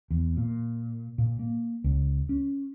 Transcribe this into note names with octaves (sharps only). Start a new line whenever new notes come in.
E2
A#2
A#2
A#3
C#2
C#4